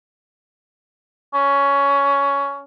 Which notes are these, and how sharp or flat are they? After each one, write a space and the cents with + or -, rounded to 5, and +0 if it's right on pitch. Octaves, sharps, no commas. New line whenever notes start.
C#4 +15